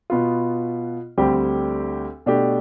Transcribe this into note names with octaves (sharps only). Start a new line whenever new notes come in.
B2 B3 F4
D2 D3 G3 C4 G4
B2 A3 D4 G4